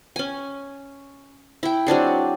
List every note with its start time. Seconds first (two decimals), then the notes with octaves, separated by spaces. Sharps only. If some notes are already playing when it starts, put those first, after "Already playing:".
0.16 C#4 G#5
1.63 E4 G5
1.86 F#3 C4 D4 G#4